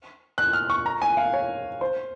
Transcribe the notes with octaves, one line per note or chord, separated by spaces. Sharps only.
F#6
F6
C#6
A#5
G#5
F5
C#5
C5